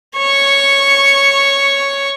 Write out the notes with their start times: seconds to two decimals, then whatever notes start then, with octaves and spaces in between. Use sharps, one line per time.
0.18 C#5 C#6